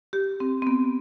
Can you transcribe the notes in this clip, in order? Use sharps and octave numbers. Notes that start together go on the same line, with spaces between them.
G4
C4
C4
B3